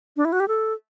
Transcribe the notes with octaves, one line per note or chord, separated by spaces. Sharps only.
D4
E4
F#4
G4
A4